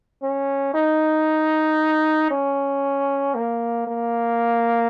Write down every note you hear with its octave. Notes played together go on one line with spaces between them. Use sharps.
C#4
D#4
C#4
A#3
A#3